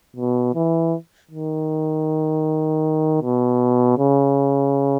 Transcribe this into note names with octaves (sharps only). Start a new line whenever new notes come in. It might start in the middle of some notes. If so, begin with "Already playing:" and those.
B2
E3
D#3
B2
C#3